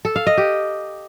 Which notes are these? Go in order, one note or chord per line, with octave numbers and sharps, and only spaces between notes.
A4
F5
D#5
G4